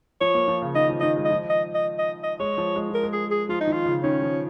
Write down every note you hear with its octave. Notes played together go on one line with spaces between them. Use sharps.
F3 C#5
A#3
F3
C#3
D#3 D#5
F3
D#3 D#5
G#3
D#5
F3
D#5
D#5
D#5
D#5
G#3 C#5
F3
G#3
F3 A#4
G#3
G#4
G#4
F3 F4
D#4
D#3 F4
C#3
D#3 C#4
F3